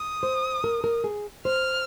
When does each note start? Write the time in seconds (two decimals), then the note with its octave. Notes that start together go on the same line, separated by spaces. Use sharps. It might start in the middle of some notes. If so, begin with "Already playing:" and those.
Already playing: D#6
0.23 C5
0.64 A#4
0.84 A#4
1.04 G#4
1.45 C5 F6